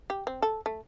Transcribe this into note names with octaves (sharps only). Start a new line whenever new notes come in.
G4
C4
A4
A3